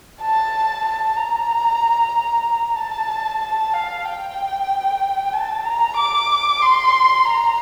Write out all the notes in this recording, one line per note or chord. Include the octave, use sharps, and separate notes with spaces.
A5
A5
A#5
A5
A5
F5
G5
A5
A#5
D6
C6
A#5